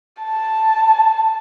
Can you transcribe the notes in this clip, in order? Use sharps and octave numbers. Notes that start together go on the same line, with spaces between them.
A5